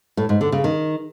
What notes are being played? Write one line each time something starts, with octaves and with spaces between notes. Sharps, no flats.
A2
G#2
D3
C#3
D#3